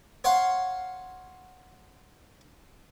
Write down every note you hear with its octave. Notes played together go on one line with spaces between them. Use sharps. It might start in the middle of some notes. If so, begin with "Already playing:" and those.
C#5 F5 F#5 C6